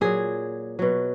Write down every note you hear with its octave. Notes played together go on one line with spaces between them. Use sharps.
A#2 F#3 G#4
B2 F#3